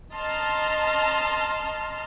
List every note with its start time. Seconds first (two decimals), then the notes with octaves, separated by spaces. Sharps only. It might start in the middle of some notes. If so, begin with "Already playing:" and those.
0.14 D#5 A5 A#5 C6 F6